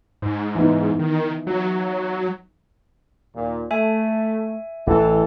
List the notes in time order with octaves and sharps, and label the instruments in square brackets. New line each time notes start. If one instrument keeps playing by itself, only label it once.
[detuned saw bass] G#2
[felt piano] E3 B3 D#4
[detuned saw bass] D#3
F#3
[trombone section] D#2 A#2
[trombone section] A3 [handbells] E5 G#5
[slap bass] A1 [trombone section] E3 A4